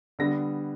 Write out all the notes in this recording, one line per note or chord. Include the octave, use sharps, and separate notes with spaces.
D3 G3 B3 A#6